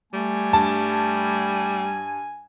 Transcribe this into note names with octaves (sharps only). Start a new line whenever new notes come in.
G3 A3 G#5
G2 A5